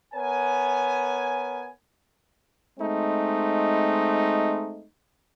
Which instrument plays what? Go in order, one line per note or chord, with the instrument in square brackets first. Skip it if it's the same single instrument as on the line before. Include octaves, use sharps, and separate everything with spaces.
[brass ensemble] B3 A#4 C#5 G#5
[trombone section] G#3 A3 C4 D#4